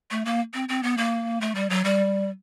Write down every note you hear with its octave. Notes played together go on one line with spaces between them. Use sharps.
A3
A#3
C4
C4
B3
A#3
A3
G3
F#3
G3